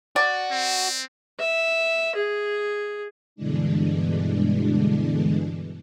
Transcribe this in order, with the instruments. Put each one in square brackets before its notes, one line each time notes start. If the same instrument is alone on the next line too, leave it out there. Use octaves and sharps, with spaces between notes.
[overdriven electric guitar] F#4 [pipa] D5
[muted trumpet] C4
[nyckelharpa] E5
G#4
[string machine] G2 B2 D3 E3 G#3 D4